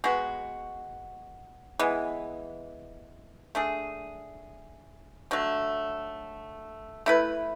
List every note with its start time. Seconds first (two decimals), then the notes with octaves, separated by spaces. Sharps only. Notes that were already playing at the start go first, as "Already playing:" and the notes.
0.04 G#3 B3 F#4
1.79 E3 G#3 B3
3.55 A3 D4 G#4
5.31 D3 F#3 A3
7.06 A3 E4 B4